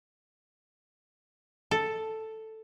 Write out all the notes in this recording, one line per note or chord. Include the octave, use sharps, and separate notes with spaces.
A4